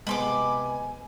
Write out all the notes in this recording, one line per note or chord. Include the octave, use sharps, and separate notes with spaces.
C3 G#3 B3 D#5 G#5 B5 C6 D6